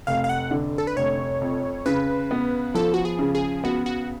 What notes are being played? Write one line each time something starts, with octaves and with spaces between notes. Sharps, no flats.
F1 F5
F5
F#5
D3
A4
B4
F1 C#5
F2
C#3 B4
B3
F3 A4
F#4
G#4
C#3
G#4
B3 F#4
F#4